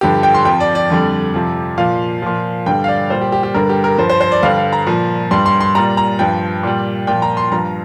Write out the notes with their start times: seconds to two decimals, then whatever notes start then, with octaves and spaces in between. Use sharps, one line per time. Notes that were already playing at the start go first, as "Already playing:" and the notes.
0.01 G2 D3 F3 G4
0.23 G5
0.34 C6
0.45 F2 F3 G5
0.60 D5
0.75 D5
0.90 F2 D3 G3
1.34 F2 C3 F3
1.78 A#2 F3 F5
2.22 A#2 F3
2.66 G2 D3 G3 G5
2.84 F5
2.88 D5
3.10 A#2 G3 C5
3.21 G4
3.32 G4
3.43 G4
3.54 G2 D3 G3 A#4
3.69 G4
3.84 A#4
3.98 G2 F3 C5
4.10 C5
4.21 C5
4.32 D5
4.43 G2 D3 G3 F5
4.58 F5
4.73 A#5
4.87 A#2 F3
5.31 G2 G3 C6
5.46 C6
5.60 C6
5.75 A#2 G3 A#5
5.97 A#5
6.19 G2 F3 G5
6.63 A#2 G3
7.07 A#2 F3 G5
7.22 A#5
7.37 C6
7.52 G2 F3 A#5